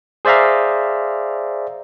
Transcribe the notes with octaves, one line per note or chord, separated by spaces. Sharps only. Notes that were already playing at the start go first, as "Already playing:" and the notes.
G#4 C5 D5 E5 F5 A#5